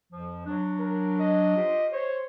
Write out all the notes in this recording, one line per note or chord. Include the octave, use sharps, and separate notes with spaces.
F2 F3
F#3 D4
A#4
D#5
F4 G4 C5
C5 C#5